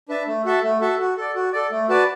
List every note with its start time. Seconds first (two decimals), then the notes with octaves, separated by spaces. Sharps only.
0.09 D4 B4 E5 A5
0.27 A3
0.45 F#4 A4 E5 A5
0.63 A3
0.81 F#4 A4 E5 A5
0.99 F#4
1.17 A4 D5
1.35 F#4
1.52 A4 D5
1.71 A3
1.89 F#4 B4 D5 A5